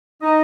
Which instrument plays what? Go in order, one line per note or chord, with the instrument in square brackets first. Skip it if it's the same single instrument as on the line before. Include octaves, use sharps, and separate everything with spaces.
[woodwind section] D#4 D#5